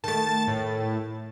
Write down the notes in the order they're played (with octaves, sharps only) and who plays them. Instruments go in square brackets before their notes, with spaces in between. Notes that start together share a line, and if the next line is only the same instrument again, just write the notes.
[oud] D#3 A3 [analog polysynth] A5 A6
[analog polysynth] A2